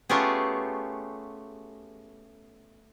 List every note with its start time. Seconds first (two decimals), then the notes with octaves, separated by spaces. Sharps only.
0.09 A3 B3 C#4 F4 G4 G#4